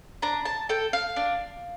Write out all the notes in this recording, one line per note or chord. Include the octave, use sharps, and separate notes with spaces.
D4 A#5
A5
A4 G5
F5
D4